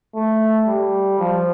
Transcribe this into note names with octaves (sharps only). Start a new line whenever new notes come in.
A3
G3
F3